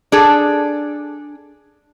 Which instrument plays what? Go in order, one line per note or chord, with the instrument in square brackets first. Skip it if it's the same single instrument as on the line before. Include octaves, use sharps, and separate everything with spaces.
[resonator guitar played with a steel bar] D4 G#4 A4